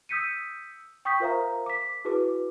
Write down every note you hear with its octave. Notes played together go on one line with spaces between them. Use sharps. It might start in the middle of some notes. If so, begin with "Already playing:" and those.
D#6 E6 G6 B6 C#7 D#7
G5 C#6 D#6 G6 B6
F4 A#4 C5 E5 F5 A#5
D6 B6
E4 F#4 G#4 B4 D6